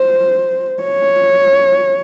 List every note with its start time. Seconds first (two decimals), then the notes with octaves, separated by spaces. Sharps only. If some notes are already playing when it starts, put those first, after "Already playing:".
Already playing: C5
0.83 C#5